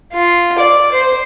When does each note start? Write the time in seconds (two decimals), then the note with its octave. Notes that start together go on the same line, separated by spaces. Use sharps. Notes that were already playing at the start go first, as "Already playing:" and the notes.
0.13 F4
0.58 D5
0.92 C5